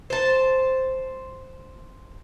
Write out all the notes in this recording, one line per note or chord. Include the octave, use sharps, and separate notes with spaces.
C5 A5